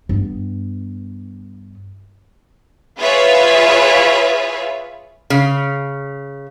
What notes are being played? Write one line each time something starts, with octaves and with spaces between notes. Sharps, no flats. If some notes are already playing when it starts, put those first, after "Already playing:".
G2 B3
F4 G#4 B4 C#5 E5
C#3